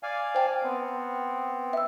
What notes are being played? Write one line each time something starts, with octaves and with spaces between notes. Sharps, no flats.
D5 F5 G#5
C5 G5 A5
B3 C4
E5 E6